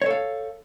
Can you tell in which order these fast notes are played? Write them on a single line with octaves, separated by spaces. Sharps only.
C#5 A4 F5